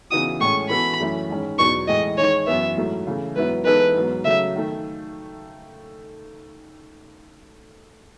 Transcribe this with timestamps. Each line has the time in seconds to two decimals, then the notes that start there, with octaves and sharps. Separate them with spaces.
0.11 C#3 E3 B3 D#4 F#4 D#6
0.41 A2 G#3 C#4 C#6
0.70 E3 B3 F#4 A4 B5
1.00 F#2 E3 A3 C#4 E4
1.30 G#2 D#3 G#3 C#4
1.59 E2 B2 F#3 B3 D#4 C#6
1.88 A2 E3 G#3 D#5
2.18 D#3 G#3 D#4 C#5
2.47 F#2 E3 B3 E5
2.77 G#2 F#3 A3 E4
3.07 C#3 E3 A3
3.36 G#2 F#3 B3 E4 B4
3.65 E3 G#3 B3 D#4 A4 B4
3.95 G#2 F#3 B3
4.25 C#3 F#3 A3 E5
4.56 D#3 A3